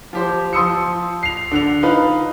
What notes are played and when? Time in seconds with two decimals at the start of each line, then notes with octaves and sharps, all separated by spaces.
0.13 F3 G4 C5
0.53 F3 C6 D#6 E6 C#7
1.23 C7 F7
1.51 D3 F7
1.82 D#4 F4 B4